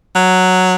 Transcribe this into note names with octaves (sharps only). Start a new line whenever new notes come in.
F#3